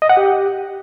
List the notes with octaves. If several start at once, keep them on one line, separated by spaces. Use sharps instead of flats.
D#5
F#5
G4